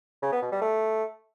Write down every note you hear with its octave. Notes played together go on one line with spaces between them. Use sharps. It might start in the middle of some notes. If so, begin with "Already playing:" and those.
C#3
B3
B2
G3
A3